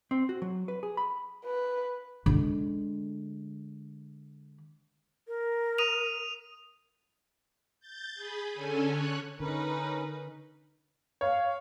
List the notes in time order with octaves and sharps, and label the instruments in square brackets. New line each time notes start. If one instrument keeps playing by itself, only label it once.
[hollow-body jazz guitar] C4
F#4
F#3
B4
G#4
B5
[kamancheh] B4
[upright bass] D3 G#3
[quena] A#4
[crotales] D#6 D#7 F7
[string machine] G6 A6
G#4 B5
D3 C#4 A4 G#5
C#5 F#6
[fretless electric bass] D3 [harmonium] C#4 A#4 [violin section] D#4 B4
[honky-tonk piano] C#5 [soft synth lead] F5